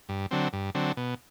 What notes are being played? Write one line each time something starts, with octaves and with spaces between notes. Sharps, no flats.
G2
D3 F#3 C4
G2
D3 F#3 C4
B2